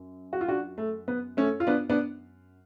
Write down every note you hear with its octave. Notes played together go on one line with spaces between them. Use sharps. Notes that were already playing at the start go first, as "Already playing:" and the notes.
Already playing: F#2
F#4
F4
D4 F#4
A3
B3
A3 C#4
F4
B3 D4
B3 D4